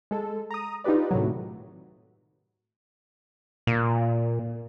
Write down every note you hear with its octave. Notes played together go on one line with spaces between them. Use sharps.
G#3 A4
A#5 D#6
D#4 F4 G4 B4 D5
A2 C3 D#3 F#3
A#2